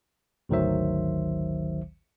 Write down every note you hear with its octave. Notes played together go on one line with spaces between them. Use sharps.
G#1 D2 D#3 F#3 C5 E5